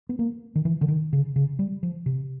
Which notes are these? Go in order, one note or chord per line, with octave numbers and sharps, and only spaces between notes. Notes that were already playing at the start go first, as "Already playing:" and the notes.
B3
A#3
D#3
E3
D3
D#3
C#3
C#3
G3
F3
C3